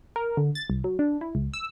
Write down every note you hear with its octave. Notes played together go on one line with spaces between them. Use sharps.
A#4
D3
A6
C2
F#3
D4
E4
C#2
E6